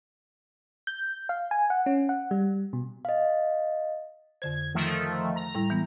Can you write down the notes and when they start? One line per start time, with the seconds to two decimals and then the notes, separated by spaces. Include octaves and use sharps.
0.87 G6
1.29 F5
1.51 G#5
1.70 F#5
1.86 C#4
2.09 F#5
2.31 G3
2.73 B2
3.05 D#5 F5
4.42 F2 D3 C5 G#6
4.75 D#3 F3 A3
5.36 A#5
5.55 A2 G3 E4
5.70 E3 G#3 B3